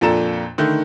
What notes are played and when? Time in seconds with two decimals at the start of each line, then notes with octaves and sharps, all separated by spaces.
0.01 F2 A#2 D4 A4 A#5 E7
0.58 D3 D#3 A3